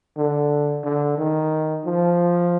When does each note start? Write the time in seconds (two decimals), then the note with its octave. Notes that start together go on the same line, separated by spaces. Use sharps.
0.17 D3
0.84 D3
1.18 D#3
1.85 F3